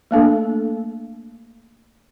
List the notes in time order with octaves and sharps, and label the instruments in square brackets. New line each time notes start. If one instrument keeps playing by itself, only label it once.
[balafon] A3 A#3 D4 A4